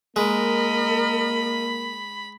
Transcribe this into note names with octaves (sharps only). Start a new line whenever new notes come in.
G#3 A#3 A#4 D#5 B5